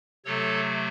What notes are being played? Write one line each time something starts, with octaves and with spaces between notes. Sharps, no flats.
C3 F#3 A3 A4 C#5